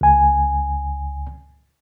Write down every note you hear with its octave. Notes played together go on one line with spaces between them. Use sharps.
C#2 G#5